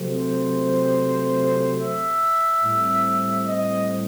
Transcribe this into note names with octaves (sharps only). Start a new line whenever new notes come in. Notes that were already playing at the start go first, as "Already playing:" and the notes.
Already playing: C3 F#3 A3 C4
C5
E5
A2 G3 C4
D#5